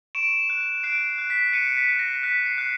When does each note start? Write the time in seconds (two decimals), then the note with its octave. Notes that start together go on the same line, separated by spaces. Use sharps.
0.15 C#6 D7 E7
0.50 F#6
0.83 F#6 C7 D7
1.18 F#6
1.30 B6
1.53 F#6 C#7 D#7
1.77 B6
1.89 F#6
1.99 A#6
2.23 F#6 B6
2.46 C7
2.58 F#6 C7